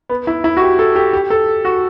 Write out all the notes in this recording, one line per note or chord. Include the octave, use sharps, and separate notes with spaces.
B3
E4
E4
F#4
G4
A4
G4
G4
A4
F#4